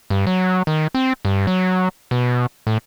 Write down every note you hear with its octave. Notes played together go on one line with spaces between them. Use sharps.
G2
F#3
D#3
C4
G2
F#3
B2
A2